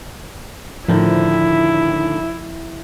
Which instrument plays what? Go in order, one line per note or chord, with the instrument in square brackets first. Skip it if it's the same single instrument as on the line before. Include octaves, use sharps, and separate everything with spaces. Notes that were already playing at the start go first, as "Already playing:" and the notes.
[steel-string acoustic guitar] A2 D3 D#3 [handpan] F3 [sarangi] E4